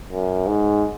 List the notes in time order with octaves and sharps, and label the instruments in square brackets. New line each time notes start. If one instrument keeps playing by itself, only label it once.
[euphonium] F#2
G#2